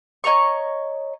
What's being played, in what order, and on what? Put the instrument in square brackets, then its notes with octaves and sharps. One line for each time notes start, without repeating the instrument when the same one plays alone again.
[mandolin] C#5 D#5 A#5 C#6